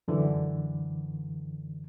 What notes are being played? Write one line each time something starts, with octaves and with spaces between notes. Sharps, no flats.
F#2 D3 E3